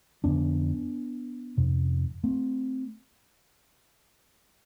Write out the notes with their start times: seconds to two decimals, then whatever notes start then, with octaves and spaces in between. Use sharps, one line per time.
0.24 F2 D3 B3 D4
1.57 F2 C3
2.24 A3 C4